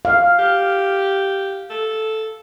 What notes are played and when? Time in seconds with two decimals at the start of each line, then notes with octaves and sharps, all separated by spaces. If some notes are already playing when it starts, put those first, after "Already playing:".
0.05 F5
0.39 G4
1.70 A4